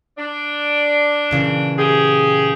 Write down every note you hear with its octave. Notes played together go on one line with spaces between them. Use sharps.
D4
A#2 C#3 E3
G4 G#4